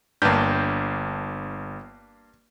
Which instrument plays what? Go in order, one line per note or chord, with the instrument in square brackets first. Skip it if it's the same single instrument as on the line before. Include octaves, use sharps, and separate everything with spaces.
[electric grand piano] G1 A5 G6 [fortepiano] G2 A#3